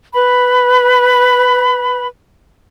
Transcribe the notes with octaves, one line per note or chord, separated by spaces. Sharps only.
B4 B5